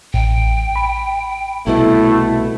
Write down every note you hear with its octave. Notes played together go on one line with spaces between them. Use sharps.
A1 G5
B5
C2 B2 A3 E4